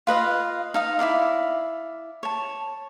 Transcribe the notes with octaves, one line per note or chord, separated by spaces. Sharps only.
F4 B4 D#5 F5
D#4 F5 D#6
E4 F4 D5 F5
C#5 A5